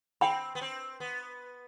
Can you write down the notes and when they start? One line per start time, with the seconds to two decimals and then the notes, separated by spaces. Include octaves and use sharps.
0.21 C4 G5 B5
0.55 B3
0.61 C4
1.00 B3